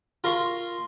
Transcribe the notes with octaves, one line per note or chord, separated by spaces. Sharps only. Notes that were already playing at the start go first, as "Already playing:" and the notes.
F4 A#4 A#5 C6 C#6